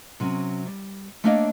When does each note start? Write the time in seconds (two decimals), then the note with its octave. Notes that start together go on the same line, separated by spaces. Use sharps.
0.20 C3 F#3 C#4
0.66 G3
1.24 A3 A#3 D4 C#5 D#5 F5